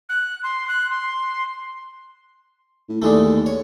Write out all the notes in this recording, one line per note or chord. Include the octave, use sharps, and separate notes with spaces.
F#6
C6
F#6
C6
A2
D#2 D3 G#3 A3
C#5